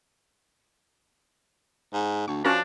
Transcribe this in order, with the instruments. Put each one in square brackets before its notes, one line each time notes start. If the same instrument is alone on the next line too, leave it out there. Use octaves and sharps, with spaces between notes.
[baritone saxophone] G#2
[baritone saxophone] D2 [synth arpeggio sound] C#6
[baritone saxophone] F3 [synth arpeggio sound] C#4 F#4 A#4 [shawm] D4